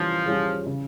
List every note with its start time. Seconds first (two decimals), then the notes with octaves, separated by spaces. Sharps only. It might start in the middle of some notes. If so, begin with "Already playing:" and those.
Already playing: E3 F3 G3 C#4 F4
0.26 G3 C#4 F4 G#4
0.66 C#3